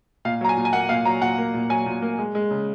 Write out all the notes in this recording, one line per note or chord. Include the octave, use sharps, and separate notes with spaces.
A#2 F5
F#3 A#5
G#5
A#2
G#5
A#3 F#5
A#2 F5
F#3 A#5
A#2 F#5
A#3
A#2
F#3 G#5
A#2
A#3
G#3
G#3
C#3